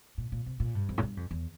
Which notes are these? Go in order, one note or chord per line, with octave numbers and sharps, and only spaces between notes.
A#2
A#2
C3
A#2
G2
F2
A2
G2
F2
E2